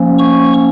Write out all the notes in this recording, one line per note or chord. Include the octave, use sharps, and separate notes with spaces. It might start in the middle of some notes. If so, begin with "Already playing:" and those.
Already playing: F3 A#3 C#4
C#6